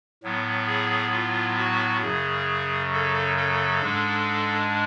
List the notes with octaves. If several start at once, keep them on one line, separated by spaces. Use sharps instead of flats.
A2 F#3 B3
G#4
F4
F#4
F#2 C#3 F#3 G#4
A4
A4
G#2 G#3 D4